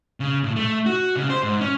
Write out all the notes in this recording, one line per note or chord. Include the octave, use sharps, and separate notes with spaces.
C#3
A2
A3
F#4
C#3
C5
G#2
C#4